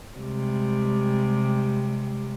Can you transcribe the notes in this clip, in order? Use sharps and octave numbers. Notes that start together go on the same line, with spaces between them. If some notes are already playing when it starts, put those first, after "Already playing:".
C3 G3 G#3